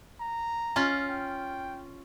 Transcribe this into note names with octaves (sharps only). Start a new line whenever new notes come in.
A#5
C#4 F4
G5